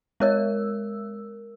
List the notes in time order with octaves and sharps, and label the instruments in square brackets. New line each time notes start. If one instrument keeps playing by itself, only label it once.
[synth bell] G#3 A#4 E6 [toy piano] E4 C#5 D#5